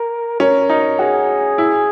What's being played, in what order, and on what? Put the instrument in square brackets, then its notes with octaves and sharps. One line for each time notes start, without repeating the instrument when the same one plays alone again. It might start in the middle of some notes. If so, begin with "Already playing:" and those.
Already playing: [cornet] A#4
[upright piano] C#4 [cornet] A#4
[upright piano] D#4
[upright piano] F#4 [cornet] G#4
[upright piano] E4